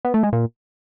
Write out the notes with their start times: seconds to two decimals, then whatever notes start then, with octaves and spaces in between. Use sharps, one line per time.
0.05 B3
0.14 A3
0.23 G#3
0.33 A#2